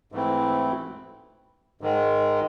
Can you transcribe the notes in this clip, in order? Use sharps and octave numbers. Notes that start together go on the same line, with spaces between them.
G#2 E3 A3 C4 E4
G#2 D#3 G#3